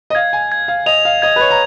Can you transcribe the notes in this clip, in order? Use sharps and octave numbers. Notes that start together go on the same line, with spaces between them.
D#5
F5 G#6
G#5
G#6
F5
D#5 F7
F5
D#5 G#6
B4
C#5
A#5